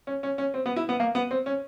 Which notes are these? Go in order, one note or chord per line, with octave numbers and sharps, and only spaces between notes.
C#4
C#4
C#4
C4
B3
E4
B3
A#3
B3
C4
C#4